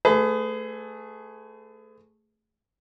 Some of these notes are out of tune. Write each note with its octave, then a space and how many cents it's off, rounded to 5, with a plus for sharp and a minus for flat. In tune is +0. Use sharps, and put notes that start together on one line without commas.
A3 +0 G#4 +0 B4 +40